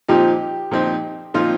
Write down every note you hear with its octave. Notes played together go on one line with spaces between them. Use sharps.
A#2 F3 C4 D#4 G4
A#2 F3 C4 D#4
A#2 F3 C4 D#4 F4